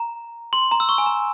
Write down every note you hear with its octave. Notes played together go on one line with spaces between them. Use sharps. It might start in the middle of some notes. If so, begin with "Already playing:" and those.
Already playing: A#5
C6
A#5
E6
C#6
G#5
A#5